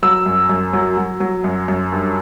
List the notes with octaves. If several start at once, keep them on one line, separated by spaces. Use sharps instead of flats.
F#3 E6
F#2
F#2
F#3
F#3
F#3
F#2
F#2
G2